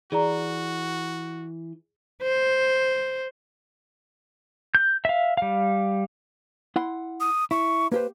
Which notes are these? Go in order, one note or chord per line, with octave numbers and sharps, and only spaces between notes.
E3 F#4 G#4 D5 A#5
C5
G6
E5 F5
G3 F5
E4 F#5 C6
D#6
E4 C#6
A#3 G4 B4 C5